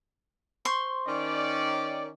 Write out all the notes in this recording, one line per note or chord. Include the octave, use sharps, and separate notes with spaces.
C5 C6 C#6
D#3 C#4 D5